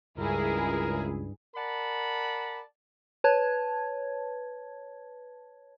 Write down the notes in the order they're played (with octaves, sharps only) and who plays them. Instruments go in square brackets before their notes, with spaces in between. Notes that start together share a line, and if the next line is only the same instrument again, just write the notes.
[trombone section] C#2 [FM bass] G2 [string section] E4 G#4 [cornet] A#4
[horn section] A#4 D5 F#5 A5 B5
[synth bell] B4 C#5 A5 G#6